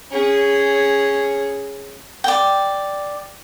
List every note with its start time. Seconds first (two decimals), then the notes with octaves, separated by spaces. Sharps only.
0.11 C#4 G#4
2.24 D5 G5